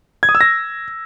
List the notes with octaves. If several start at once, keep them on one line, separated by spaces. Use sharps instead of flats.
G#6
D#6
E6
A#6